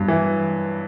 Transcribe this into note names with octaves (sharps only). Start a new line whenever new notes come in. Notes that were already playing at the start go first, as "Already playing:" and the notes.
Already playing: G2 F#3
E3